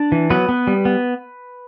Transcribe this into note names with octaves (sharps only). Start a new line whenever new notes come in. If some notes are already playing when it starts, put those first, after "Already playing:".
Already playing: D4 D5
E3
F#3 B3 B4
B3
G3
B3